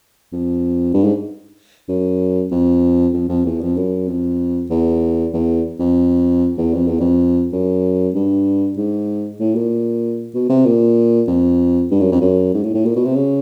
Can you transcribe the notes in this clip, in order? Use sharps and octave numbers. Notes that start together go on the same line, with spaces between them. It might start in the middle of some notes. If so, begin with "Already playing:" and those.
F2
G2
G#2
F#2
F2
F2
F2
E2
F2
F#2
F2
E2
E2
F2
E2
F2
E2
F2
F#2
G2
G#2
A2
A#2
B2
C3
A#2
F2
G2
F#2
F2
F#2
G#2
A2
A2
A#2
B2
C3
C#3